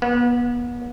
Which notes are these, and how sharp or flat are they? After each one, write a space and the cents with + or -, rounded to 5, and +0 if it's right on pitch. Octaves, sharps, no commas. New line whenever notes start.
B3 -35